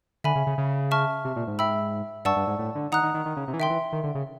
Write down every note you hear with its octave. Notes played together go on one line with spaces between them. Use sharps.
D3 E5 G#5 B5
C#3
C#3
C#3
E5 A5 C#6 F6
C3
A#2
G#2
E5 G5 B5 E6
G2 D5 F#5 A5 C#6 E6
G2
G#2
A2
D3
D#3 F#5 A#5 D#6 F#6
D#3
D#3
D#3
C#3
C3
E3
D#3 E5 G5 C6
E3
D#3
D3
C#3